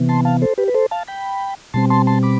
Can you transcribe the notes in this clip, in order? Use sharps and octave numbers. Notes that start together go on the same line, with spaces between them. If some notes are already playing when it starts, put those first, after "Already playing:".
Already playing: C3 E3 B3
A5 C6
F5 A5
A4 C5
G4 B4
B4
A4 C5
F5 A5
G5 B5
B2 G3 C4 A5 C6
A5 C6
A5 C6
B5 D6